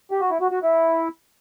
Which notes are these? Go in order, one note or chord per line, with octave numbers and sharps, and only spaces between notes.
G4
F#4
E4
F#4
F#4
E4